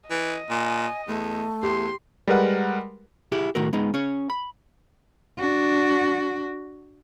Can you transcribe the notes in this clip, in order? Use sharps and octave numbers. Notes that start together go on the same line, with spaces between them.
E3 D#5
A#2 G#5
E2 A3
E2 G4 C6
G3 G#3 A#4 B4 F#5
E4 G4 G#4
A2 D#3 A3 F#4 A#4
G#3 B3 D#4
C#4 G#4 C#5
B5
D4 F#4